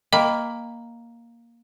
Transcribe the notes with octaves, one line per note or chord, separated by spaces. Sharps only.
A#3 D#5 G5 B5